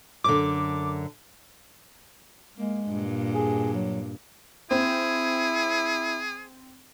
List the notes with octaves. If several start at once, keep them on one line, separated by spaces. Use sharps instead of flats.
F#2 D3 D6
G#3 A#3
G2 A#2
G#4
F#3
C4 E4 G#4